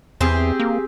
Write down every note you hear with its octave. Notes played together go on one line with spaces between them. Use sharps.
E2 C4 G4 G#4
A#3